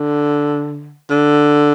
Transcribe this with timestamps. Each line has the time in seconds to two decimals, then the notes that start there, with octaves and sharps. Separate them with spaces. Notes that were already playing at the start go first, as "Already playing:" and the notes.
Already playing: D3
1.10 D3